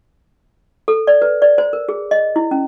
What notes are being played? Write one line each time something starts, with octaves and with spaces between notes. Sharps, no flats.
A4
D5
B4
D5
C5
A#4
G#4
D#5
E4
C#4